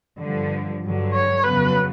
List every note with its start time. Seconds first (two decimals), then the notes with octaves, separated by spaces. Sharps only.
0.20 G2 D3 F3
0.82 G2 D3 F#3
1.13 C#5
1.43 F2 C#3 F#3 B3 B4